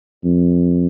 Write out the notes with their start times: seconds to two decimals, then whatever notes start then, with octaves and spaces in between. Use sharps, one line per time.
0.24 F2